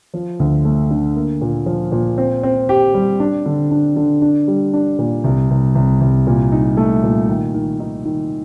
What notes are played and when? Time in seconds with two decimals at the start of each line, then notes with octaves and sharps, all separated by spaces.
0.14 F3
0.40 D2
0.65 A3
0.91 D3
1.16 A#3
1.41 A#2
1.66 F3
1.92 A#2
2.18 C4
2.43 C4
2.69 G4
2.94 G3
3.20 D4
3.46 D3
3.71 D4
3.96 D3
4.22 D4
4.48 G3
4.73 D4
4.99 A#2
5.24 C2
5.51 C2
5.75 C2
6.01 C2
6.27 A#2
6.52 D#4
6.77 A3
7.03 A#2
7.29 D#3
7.54 D#3
7.80 D#4
8.05 D#3